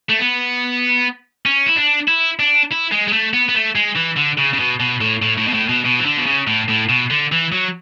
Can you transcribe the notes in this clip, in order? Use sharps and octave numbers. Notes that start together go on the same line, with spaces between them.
A3
B3
C#4
E4
D4
E4
D4
E4
G#3
G#3
A3
B3
B3
A3
G#3
E3
D3
C#3
C#3
B2
B2
A2
A2
A2
B2
A2
B2
B2
E3
D3
B2
C#3
A2
A2
B2
D3
E3
F#3